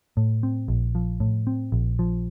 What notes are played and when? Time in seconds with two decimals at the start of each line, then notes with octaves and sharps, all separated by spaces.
0.17 A2
0.43 C4
0.68 A#1
0.95 F3
1.20 A2
1.47 C4
1.72 A#1
1.99 F3